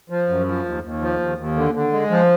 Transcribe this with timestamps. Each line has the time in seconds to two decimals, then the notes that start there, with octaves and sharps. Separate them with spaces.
0.10 F3
0.28 F#2
0.46 F3
0.65 D#2
0.83 D#2
1.01 F3
1.20 D#2
1.38 D#2
1.56 D3
1.74 D3
1.92 G#3
2.11 F3